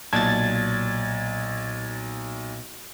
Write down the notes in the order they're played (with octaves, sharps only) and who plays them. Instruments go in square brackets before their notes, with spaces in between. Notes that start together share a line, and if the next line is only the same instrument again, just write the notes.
[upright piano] B1 [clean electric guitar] A#2 D5 A5 [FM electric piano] G#6 A6